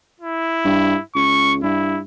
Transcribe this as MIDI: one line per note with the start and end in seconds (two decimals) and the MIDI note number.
0.20 1.02 64
0.65 0.96 43
1.15 1.59 37
1.15 1.54 85
1.63 2.02 43
1.63 2.01 64